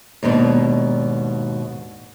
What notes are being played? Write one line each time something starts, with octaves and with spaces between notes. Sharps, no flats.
D#2 G#2 B2 D4